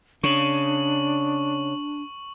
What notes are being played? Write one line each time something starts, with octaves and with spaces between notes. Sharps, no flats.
C#3 D4 C#6 F#7